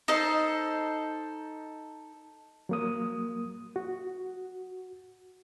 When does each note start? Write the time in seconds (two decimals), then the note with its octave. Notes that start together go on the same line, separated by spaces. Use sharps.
0.08 D#4 A4 C5
2.69 F#3 A#3 D#6
3.76 F#4